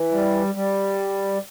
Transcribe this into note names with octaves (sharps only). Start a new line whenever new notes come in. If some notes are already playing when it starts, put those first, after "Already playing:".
Already playing: E3
G3
G3